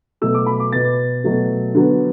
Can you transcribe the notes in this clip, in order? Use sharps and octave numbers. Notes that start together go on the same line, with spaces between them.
B2 F#3 A3 E6
D6
B5
D6
B2 B3 A6
B2 F#3 A3
D3 F#3 B3